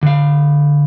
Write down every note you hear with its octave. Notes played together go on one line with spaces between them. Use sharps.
D3 F5